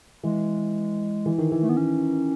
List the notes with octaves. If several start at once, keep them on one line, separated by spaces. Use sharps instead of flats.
E3 G#3
E3
D#3
E3
A3
B3
C#4